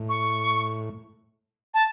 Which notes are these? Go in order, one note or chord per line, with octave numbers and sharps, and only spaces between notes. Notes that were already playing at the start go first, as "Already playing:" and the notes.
Already playing: A2
C#6
A5